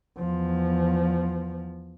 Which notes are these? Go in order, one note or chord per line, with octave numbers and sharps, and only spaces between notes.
E2 F3